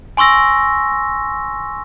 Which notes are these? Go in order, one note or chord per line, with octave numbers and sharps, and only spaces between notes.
G#5 C6 C#6 E6 A#6